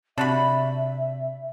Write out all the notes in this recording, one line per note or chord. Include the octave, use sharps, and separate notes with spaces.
C3 D4 F#4 E5 B5